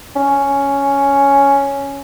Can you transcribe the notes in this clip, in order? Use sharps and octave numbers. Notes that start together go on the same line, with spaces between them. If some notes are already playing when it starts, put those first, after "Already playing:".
C#4